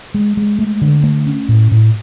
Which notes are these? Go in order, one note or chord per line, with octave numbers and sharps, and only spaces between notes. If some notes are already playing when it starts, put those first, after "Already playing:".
G#3
G#3
A3
D3
A3
C#4
A2
A2